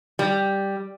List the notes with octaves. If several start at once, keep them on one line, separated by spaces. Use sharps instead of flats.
G3